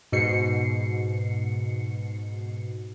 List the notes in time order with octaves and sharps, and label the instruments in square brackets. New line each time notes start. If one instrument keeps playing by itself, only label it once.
[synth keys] G#2 B2 C7 C#7